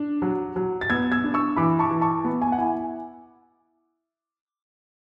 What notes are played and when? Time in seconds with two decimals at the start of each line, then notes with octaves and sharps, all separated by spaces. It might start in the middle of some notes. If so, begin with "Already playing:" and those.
Already playing: D4
0.22 F#3
0.56 F#3
0.81 A6
0.90 B3 E6 G#6
1.12 E6 G#6
1.24 D4
1.34 C#6 E6
1.56 E3 B5 D6
1.79 A5 C#6
1.91 E3
2.01 A5 C#6
2.24 B3
2.42 G#5
2.52 F#5
2.58 E4 G#5